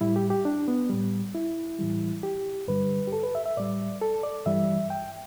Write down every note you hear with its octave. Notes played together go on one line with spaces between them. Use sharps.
A2 G3 E4
G4
G4
D4
B3
A2 G3
E4
A2 E3 G3
G4
G2 D3 G3 B4
G4
A4
B4
E5
E5
A2 G3 D5
A4
D5
G2 E3 G3 E5
G5